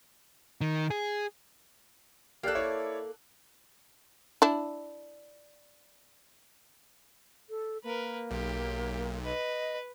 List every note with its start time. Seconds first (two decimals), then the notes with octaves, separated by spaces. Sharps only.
0.61 D#3
0.91 G#4
2.43 A#3 G4 A4 D5 F#6
2.55 E4 C#5 D5
4.42 D4 E4
7.50 A4
7.84 A#3 A#4 B4
8.31 B1 G4
9.25 B4 D#5